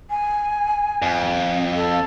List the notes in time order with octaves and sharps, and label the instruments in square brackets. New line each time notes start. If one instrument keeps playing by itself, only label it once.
[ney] G#5
[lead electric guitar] F2
[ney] A4